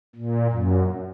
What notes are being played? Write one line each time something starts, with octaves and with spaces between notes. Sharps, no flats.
A#2
F#2